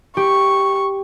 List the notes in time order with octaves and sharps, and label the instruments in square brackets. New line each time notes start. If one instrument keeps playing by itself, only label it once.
[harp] G4 [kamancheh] C#6